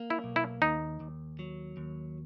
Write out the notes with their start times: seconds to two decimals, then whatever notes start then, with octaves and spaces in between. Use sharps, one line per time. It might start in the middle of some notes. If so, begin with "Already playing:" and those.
Already playing: A#3
0.10 E4
0.24 B1
0.36 E4
0.62 D#2 D#4
1.00 D#2
1.39 F#3
1.77 D#2